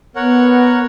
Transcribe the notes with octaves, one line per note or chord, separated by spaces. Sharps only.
B3 A#4 C#5 F#5